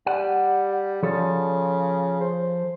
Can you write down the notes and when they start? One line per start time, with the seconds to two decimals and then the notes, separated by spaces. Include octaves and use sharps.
0.07 G3 F#5
1.03 C#3 F3 A4
2.21 C5